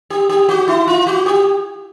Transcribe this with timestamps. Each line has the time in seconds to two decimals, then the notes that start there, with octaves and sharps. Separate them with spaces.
0.10 G4
0.29 G4
0.49 F#4
0.68 E4
0.87 F4
1.07 F#4
1.26 G4